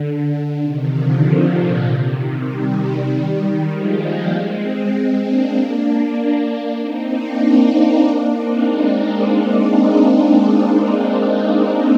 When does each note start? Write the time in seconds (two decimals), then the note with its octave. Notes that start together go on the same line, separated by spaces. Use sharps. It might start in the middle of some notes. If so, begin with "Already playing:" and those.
Already playing: D3
0.61 C3 D#3
0.92 D3 F3
1.23 C3
1.54 A#2
1.85 C3
2.15 C3 D#3
2.46 D#3 G3
3.70 F3 G#3
4.01 G3 A#3
4.32 G#3 C4
4.94 G#3 C4
5.24 A#3 D4
5.55 A#3 D4
6.79 C4 D#4
7.10 A#3 D4
8.02 A#3 D4
8.34 C4 D#4
8.65 G#3 C4